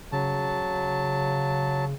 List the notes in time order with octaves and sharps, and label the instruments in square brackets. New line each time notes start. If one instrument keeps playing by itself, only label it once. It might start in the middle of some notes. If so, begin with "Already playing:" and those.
[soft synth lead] C#3 [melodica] F#3 A5